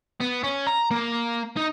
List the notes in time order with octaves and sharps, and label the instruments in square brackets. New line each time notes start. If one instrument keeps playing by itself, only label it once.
[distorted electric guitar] B3
C#4
A#5
A#3
D#4